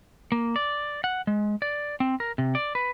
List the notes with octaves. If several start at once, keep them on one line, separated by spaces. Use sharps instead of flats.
A#3
D5
F#5
G#3
D5
C4
A#4
C3
D5
B4